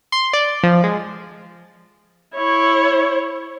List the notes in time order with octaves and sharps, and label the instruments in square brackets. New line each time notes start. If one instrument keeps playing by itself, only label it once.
[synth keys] C6
D5
F3
G#3
[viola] E4 C#5